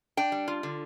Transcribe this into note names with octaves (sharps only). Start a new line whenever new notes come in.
D4 G5
G3
F4
D3